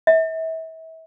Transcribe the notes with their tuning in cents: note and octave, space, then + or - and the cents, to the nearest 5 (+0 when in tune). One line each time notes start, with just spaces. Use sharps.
E5 -35